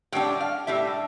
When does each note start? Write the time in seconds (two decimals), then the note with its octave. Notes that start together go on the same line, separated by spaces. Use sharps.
0.12 A2 G3 D4 G5
0.40 F5
0.67 A2 G3 D4 E5